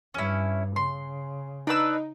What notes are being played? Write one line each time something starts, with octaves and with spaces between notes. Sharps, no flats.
G2 C#4 E4
C#3 C6
D4 D#4 B4 E6